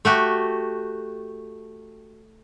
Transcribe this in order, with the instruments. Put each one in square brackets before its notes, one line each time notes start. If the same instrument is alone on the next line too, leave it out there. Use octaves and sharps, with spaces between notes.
[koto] A3 F#4 G4